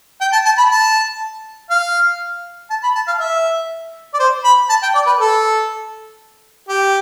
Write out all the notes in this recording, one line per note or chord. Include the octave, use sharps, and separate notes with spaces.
G5
A5
A5
B5
A5
F5
A5
B5
A5
F5
E5
D5
C5
B5
A5
G5
D5
B4
A4
G4